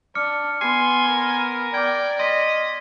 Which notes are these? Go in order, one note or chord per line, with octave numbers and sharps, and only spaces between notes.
D4 D6 F6 C#7
B3 G#5 C6 C7
A#4
D5 G5 D6 G#6
D#5 C6 B6